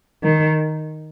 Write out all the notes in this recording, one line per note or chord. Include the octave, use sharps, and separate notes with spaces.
D#3